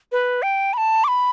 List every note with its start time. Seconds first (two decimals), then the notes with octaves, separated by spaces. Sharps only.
0.12 B4
0.43 G5
0.73 B5
0.78 A5
1.04 D6
1.08 B5